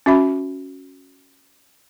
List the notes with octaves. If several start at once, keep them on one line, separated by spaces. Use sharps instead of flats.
C#4 F#4 E5 B5